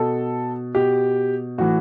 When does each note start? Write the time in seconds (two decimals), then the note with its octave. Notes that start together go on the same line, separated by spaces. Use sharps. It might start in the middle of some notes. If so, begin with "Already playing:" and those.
Already playing: B2 A4
0.75 B2 G4
1.58 A2 E3 F#4